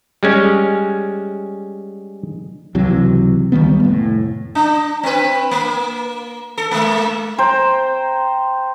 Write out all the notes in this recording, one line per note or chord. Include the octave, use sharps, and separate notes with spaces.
G3 G#3 C#4
C#2 C3 E3 F#3
C#2 D#3 G3 B3
F1 A2
D4
C4 B4
A#3
A4
G#3 A#3
C5 G5 A#5